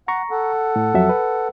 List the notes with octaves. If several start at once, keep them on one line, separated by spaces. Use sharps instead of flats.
F#5 A#5 C#6
A4 F#5
A2
F2 F#3 E5
B4